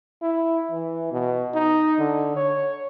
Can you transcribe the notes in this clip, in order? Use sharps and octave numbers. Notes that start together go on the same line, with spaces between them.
E4
E3
B2
D#4
D3
C#5